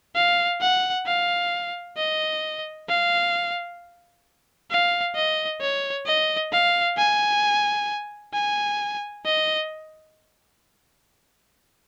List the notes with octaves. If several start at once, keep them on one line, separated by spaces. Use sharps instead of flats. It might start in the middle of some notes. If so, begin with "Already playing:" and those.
F5
F#5
F5
D#5
F5
F5
D#5
C#5
D#5
F5
G#5
G#5
D#5